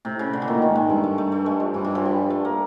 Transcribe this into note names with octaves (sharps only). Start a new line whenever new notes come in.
A2 C3
C#3
D3
E3
A#2 D#3
D#3
G#2
G#3
G2 A3
A3
A3
A3
G#3
F3
G2 E3
E3
F3
G3
A3
A#3